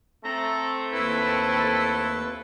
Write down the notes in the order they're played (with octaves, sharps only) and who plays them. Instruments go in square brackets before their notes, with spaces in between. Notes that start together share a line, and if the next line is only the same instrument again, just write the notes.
[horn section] A3 C4 A4 [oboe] A#5
[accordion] D#2 B4 [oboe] E4